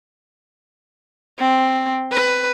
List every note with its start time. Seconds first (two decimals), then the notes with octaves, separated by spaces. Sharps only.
1.39 C4
2.12 B4